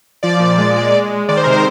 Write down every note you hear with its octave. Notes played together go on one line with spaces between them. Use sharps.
F3 D5
A#2
G#3
G#3
G#3
G#3
D#3 D5
C5
C3 A#4
C5